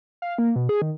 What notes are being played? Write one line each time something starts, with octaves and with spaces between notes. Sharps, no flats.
F5
A#3
B2
G#4
D#3